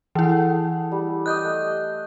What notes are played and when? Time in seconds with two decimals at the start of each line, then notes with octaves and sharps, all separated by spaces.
0.15 E3 E4 G#4 A4 F#5
0.92 G3
1.26 D#5 D6 D#6 F#6 G6
1.44 A3